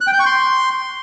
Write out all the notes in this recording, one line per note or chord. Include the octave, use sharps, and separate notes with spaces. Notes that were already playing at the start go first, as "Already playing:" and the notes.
F#6
G5
G6
C#6
C6